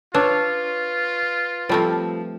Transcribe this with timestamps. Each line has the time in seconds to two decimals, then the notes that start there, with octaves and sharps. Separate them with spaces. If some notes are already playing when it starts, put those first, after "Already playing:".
0.15 D4 F4 B4 C#5
1.69 F3 G3 A3 C4